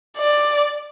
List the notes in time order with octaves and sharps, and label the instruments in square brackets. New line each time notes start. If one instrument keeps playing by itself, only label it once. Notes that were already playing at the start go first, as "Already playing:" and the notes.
[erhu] D5